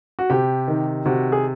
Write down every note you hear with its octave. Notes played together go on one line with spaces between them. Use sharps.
F#4
C3 G4
D#3
C3 F#4
G#4